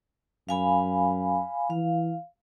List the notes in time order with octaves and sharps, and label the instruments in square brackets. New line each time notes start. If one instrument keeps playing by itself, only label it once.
[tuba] F#2 [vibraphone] F5 G#5 B5
[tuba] E3 [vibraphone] F5